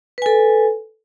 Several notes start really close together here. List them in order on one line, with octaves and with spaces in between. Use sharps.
B4 G#5 A4